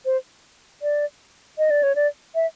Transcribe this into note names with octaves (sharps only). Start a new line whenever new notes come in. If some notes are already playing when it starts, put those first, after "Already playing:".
C5
D5
D#5
D5
C#5
D5
E5